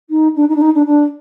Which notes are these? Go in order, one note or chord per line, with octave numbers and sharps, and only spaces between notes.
D#4
D4
D#4
D4
D#4
D4
D4